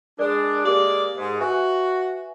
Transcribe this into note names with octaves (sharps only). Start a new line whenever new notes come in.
G#3 D4 A#4 D5
G#3 A#3 G4 A#4 D5
G#2
F#4 B4 E5 G#5